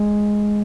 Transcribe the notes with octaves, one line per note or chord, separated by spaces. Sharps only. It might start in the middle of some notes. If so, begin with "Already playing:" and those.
Already playing: G#3